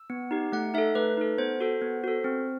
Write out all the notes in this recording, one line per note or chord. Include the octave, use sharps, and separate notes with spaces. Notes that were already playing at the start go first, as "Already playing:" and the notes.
Already playing: E6
B3
D#4 G4
A3 F#5
D#4 A4 E5
A3 B4
D#4 A4
B3 C5
F#4 A4
B3
F#4 A4
C4